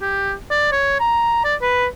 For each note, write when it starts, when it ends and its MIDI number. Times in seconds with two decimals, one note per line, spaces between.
0.01 0.33 67
0.51 0.70 74
0.72 0.99 73
1.00 1.43 82
1.44 1.55 74
1.61 1.86 71